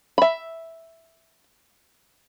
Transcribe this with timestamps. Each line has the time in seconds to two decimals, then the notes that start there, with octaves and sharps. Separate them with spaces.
0.18 E5 B5